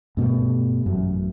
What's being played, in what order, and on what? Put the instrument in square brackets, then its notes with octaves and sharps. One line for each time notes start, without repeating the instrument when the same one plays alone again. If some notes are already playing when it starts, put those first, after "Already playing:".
[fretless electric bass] G2 B2 G3 A3
A1 F#2